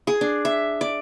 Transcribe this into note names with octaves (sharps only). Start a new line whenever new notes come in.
G#4
D4
E5
D5